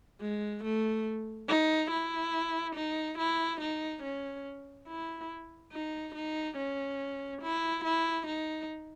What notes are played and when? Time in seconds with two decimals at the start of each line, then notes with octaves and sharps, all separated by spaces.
0.21 G#3
0.64 A3
1.48 D#4
1.91 E4
2.76 D#4
3.19 E4
3.61 D#4
4.03 C#4
4.88 E4
5.72 D#4
6.15 D#4
6.57 C#4
7.42 E4
7.85 E4
8.27 D#4